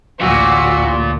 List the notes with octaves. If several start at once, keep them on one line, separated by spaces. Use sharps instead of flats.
A1 D2 A#2 F#4 E6